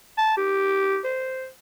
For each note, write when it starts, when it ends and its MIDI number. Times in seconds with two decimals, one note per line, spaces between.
0.18 0.36 81
0.37 0.99 67
1.04 1.48 72